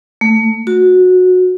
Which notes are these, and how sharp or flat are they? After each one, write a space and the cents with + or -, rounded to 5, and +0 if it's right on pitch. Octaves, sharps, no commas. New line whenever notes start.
A3 +15
F#4 -15